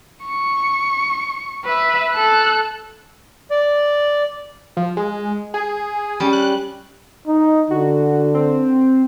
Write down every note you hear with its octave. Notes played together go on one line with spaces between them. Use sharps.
C#6
B4 E5
A4 F#6
D5
F3
G#3
G#4
G3 C#4
F#6
D#4
D3 F#4
C4